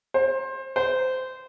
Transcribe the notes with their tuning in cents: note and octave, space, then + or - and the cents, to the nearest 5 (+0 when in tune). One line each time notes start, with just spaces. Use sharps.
C5 +20
C5 -20